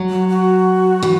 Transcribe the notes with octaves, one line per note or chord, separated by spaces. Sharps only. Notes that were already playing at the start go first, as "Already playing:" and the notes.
Already playing: F#3
F#4
F#4
E3